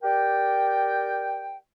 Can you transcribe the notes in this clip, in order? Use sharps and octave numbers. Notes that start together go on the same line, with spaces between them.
G4 A#4 D5 G5